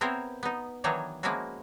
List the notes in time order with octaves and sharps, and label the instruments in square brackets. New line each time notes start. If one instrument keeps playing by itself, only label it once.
[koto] B3 C4 E4 A#4 C5 C#5
B3 D#4
D#3 E3 F#3 D4 D#4 C#5
F3 G#3 A#3 C#4 E4 F#4